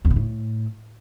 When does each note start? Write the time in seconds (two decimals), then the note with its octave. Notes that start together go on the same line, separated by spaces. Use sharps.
0.05 E2
0.10 B2
0.16 A2